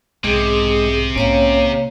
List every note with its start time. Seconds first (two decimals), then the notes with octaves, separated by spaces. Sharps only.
0.24 B1 G#2 C3 G#3 G#4 D#6
1.16 B1 G#2 A#3 C#4 C#5 F5